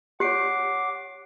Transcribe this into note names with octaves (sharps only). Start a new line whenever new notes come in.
G4 C#5 F#5 D6 F#6 C7 D7